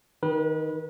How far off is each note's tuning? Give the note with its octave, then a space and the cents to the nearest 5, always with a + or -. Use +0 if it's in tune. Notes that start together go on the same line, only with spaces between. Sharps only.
D#3 +5 B4 -30